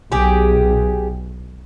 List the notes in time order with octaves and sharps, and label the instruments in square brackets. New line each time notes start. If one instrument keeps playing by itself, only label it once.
[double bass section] B1 [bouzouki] G4 G#4